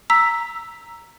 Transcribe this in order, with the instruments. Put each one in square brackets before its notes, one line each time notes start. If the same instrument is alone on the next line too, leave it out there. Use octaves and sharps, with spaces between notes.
[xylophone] A#5 E6 B6